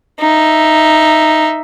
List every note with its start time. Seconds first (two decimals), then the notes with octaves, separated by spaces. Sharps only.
0.20 D#4 E5